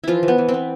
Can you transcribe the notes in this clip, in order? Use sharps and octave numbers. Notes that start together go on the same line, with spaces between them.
E3 F3 E4 F4
E3
B3
E3
C4
B3